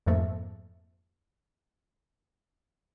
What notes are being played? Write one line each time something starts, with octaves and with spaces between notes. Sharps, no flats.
F2 G#2 F3 A3 A#3